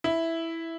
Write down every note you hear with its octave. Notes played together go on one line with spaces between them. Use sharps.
E4